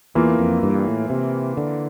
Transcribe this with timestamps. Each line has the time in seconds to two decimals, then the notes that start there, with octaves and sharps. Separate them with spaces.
0.15 E2 E3 A#3 F4 A#4
0.39 F2
0.63 G2
0.87 A2
1.10 C3
1.57 D3